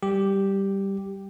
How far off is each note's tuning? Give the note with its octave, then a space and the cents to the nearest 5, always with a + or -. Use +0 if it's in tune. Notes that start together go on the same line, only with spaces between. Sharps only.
G3 +0 G4 +0